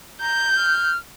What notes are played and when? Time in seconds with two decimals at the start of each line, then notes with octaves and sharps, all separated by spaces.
0.21 A#5 G6
0.56 F6